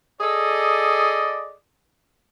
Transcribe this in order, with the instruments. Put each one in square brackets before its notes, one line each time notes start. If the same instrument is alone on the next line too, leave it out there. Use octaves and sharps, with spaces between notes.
[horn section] G#4 A4 D5 D#5